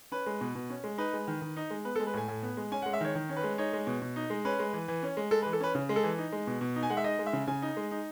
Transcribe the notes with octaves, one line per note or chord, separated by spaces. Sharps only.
C#4 B4
G#3
B2
B2
C#4
G#3
D#4 B4
G#3
D#3
D#3
D#4
G#3
B3 B4
A4
G#3
B4
A2 G#5
A2
B3
G#3
C#4 G#5
F#5
G#3
E5
D#3 C#5
D#3
C#4
B4
G#3
D#4 C#5
G#3
B2
B2
D#4
G#3
C#4 B4
G#3
E3
E3
C#4
G#3
G#3 A4
B4
E3
A4
C#4 B4
C#3
G#3
A4
E3
D#4
G#3
B2
B2
D#4
G#5
G#3 F#5
E5
D#4 D#5
G#3
E5
C#3
C#3 G#5
D#4
G#3
D#4